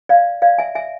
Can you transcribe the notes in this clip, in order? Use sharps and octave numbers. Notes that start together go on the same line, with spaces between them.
D5 F5
D5 F5
E5 G#5
E5 G#5